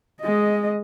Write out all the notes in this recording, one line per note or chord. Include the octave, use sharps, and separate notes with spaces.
G#3 D#5